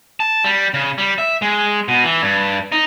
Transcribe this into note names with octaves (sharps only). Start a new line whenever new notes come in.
A5
G3
C#3
G3
E5
G#3
B2
E3
G2
D#4